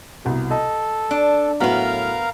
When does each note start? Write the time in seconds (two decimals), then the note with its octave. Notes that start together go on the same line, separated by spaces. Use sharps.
0.25 C2 B2
0.50 A4 D#5
1.11 D4
1.60 A2 F#3 B3 F#4 A#4 B4 F5 A#5